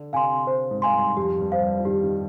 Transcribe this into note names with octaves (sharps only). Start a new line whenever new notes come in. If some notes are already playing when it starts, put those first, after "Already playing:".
Already playing: D3
C3 F5 G#5 C6
C5
G#2
F5 G#5 C6
G2
F2 G4
G2
C5 F5
G2
F3
D#3 G4
D#3